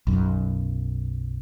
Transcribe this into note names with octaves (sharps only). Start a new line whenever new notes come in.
B1 F#2